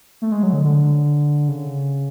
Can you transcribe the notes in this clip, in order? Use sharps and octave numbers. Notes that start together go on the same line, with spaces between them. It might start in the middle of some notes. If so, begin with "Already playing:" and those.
A3
G#3
F#3
D3
D3
C#3